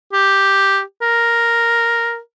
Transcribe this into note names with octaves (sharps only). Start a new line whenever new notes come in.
G4
A#4